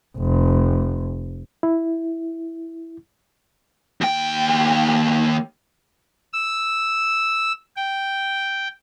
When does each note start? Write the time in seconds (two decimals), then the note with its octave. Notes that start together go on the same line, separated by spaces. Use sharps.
0.18 F1
1.63 E4
4.01 D#2 G5
6.33 E6
7.77 G5